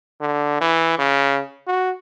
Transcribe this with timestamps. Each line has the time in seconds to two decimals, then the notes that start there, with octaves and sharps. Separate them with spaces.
0.21 D3
0.61 E3
0.99 C#3
1.67 F#4